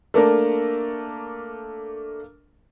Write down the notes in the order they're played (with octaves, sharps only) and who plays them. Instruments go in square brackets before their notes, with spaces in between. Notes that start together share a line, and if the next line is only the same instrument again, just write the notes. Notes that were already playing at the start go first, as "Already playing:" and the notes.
[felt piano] A3 A#3 D4 A#4